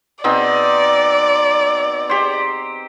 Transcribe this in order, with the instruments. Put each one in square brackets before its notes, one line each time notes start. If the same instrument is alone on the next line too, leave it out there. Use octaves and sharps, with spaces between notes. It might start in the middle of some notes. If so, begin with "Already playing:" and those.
[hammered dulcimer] B2 C4 D#4 [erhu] D5
[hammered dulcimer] G4 C5